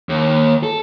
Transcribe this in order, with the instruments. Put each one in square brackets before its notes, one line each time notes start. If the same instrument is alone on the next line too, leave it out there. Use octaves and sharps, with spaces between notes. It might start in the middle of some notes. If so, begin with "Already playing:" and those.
[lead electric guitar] D#2
A4